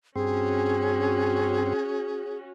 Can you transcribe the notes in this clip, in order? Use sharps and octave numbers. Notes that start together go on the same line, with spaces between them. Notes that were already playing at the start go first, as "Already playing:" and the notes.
G2 C4 C#4 F#4 G#4